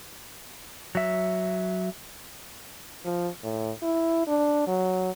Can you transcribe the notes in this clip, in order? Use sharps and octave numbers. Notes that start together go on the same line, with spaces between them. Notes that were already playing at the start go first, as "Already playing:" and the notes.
F#3 E5
F3
A2
E4
D4
F#3